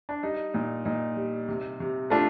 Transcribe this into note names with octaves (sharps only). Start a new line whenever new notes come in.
D4
G3 D#4
A#2 D#4
A#2 D#4
G3
C3
C3
A3 D4 F4